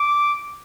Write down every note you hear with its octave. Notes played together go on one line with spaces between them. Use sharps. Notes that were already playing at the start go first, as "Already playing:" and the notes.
Already playing: D6